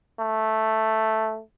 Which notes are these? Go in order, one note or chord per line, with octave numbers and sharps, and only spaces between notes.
A3